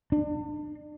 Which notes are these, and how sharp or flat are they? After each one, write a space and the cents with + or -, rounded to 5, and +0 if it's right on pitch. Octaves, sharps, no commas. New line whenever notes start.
D4 +35